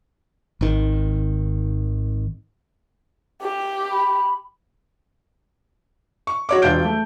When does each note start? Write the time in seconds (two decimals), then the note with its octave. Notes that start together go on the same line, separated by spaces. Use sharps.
0.61 G#1 D#3
3.41 G4
3.91 B5
6.27 C#6
6.49 F#4 C#5 D6
6.62 E1 D4 F4 G6 D7
6.85 A3